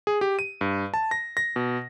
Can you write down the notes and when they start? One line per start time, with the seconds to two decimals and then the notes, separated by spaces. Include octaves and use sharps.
0.07 G#4
0.21 G4
0.39 D#7
0.61 G2
0.94 A5
1.11 A#6
1.37 A#6
1.56 B2